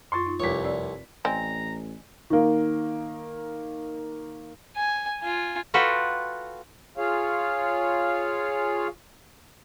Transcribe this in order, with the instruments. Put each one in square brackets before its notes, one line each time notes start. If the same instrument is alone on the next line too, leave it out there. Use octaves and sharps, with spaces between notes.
[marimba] F#2 F4 [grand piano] C6 C#6 A6
[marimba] D#4 F4
[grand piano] F1 D6 B6 [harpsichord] C2 C#5 [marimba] F4
[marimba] C4 D5 E6
[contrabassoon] A1 [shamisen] C4 [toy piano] D5 D#5 G#5 [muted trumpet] A#5
[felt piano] D#3 A#3
[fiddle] G#5
F4 G#5
[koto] F4 F#4 A4 B4 G5
[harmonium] F4 G#4 C#5 F5